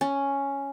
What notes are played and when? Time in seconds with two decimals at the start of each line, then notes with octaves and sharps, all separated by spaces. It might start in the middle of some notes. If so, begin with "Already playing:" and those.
0.01 C#4